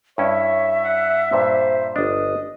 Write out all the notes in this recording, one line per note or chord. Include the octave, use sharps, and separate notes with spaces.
G2 C#4 E4 C#5 E5
F#5
G2 A#2 C5
G1 D4 D#5